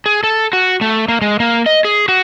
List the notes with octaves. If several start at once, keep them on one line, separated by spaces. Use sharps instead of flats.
G#4
A4
F#4
A3
A#3
G#3
A#3
D#5
G#4
F#4